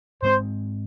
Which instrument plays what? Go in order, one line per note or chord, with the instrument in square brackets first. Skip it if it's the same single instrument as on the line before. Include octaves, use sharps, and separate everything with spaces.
[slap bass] G#2 G#3 C4 [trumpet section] C5